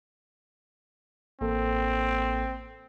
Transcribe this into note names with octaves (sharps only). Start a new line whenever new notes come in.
A1 A#3 C4 A4